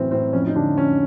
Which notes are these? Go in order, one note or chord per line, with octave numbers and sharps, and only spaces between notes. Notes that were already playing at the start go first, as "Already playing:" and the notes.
Already playing: F#2 A2 E3 C4
A2 C4
F2 C#4
D#4
D3 D4
F2 C#4